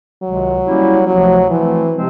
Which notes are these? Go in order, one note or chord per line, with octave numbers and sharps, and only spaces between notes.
C#2 C3 D#3 F#3 G#3
G3 A#3 C#4 E4 G4
D2 C3 F3 F#3 A3
E3 F3 A3 C4
C3 F3 G#3 C4